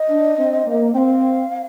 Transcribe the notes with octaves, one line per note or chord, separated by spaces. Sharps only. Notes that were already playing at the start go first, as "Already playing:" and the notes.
Already playing: D#5
D4
C4
A#3
C4 F5 G5